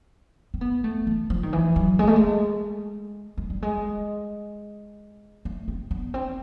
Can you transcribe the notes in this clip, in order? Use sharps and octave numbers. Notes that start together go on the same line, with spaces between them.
C4
B3
A3
E3
F3
D#3
E3
F#3
G#3
A3
G#3
G#3
G3
G#3
A3
C4
B3
C4